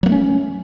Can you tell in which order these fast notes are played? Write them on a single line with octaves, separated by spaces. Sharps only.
F#3 A#3 A3 C#4